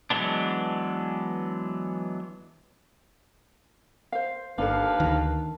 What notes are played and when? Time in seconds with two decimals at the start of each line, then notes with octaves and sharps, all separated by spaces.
0.10 E3 F#3 G#3 B3 D4
4.12 C5 F5
4.58 G1 D#2 D4 A4 B4 F5
5.00 D2 D#3